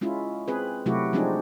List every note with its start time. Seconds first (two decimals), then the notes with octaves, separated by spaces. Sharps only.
0.01 G#3 C#4 E4 F4
0.48 C4 G#4 B4
0.86 C3 F#3 A3 E4 F#4 G4
1.13 F3 G#3 C4 D4 D#4 G#4